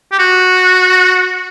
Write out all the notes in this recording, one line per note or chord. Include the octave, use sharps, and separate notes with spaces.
G4
F#4